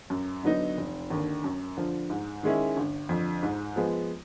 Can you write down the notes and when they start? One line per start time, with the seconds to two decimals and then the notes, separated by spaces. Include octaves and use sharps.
0.10 F#2
0.43 D3 F#3 B3 D#4
0.77 F1
1.10 D#2 D3
1.44 F#2
1.77 D3 F3
2.10 G#2
2.43 D#3 G#3 C#4 E4
2.77 G1
3.09 F2 D3
3.43 G#2
3.76 F3 G#3 B3